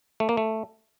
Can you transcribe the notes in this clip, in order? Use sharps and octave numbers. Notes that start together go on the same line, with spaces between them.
A3
A#3
A3